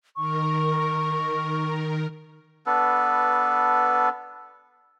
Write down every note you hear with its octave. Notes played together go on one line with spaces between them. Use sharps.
D#3 A#4 C#6
B3 D4 A4 B4